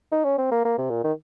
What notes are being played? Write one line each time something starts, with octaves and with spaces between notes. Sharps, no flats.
D#4
C#4
C4
A#3
A#3
C3
A#2
D#3